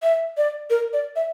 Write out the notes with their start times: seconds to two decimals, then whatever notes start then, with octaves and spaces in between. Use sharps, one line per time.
0.03 E5
0.37 D5
0.70 A#4
0.93 D5
1.16 E5